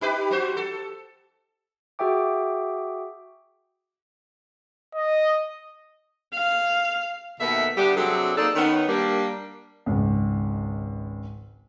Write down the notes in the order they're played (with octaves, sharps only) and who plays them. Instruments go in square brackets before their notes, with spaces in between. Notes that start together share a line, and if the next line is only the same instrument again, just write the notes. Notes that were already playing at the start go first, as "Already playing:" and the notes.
[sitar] D#4 G4 B4
G3 F#4 C5
A4
[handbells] F#4 G#4 E5 G5 D6
[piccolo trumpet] D#5
[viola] F5
[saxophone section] D#2 B2 A3 B3 A#4 E5
D3 G3 B3 D4 G4
C3 F#3 C4 D4 G#4 A4
A#3 D#4 G#4 A4 D5
D#3 B3 C#4
G3 A#3 D4
[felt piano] G#1 C#2